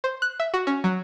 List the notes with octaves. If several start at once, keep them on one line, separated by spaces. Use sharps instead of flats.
C5
F#6
E5
F#4
C#4
F#3